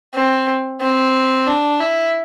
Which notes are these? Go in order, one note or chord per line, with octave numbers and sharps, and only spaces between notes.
C4
C4
D4
E4